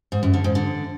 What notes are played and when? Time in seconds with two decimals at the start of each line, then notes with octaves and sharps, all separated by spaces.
0.12 G#2
0.23 F#2
0.34 D3
0.44 G#2
0.55 D3